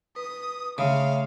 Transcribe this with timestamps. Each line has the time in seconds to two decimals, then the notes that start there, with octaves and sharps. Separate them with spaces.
0.16 B4 D#6
0.78 C#3 A3 E5 F5 C6